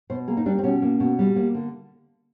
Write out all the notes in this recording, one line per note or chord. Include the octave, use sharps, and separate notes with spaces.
B2 C5
A#3 G#4
D#4
G3 D4
C4
B2 C#4
A#3
B2
G3
A#3
D3